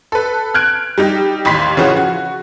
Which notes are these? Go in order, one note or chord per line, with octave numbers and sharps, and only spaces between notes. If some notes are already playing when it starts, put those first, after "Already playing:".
A4 B4
F6 F#6 G#6 D7
G3 D#4 G4
A1 D#2 B5 C6 B6
C#3 E3 F3 C#4 F#4 G#4
F#4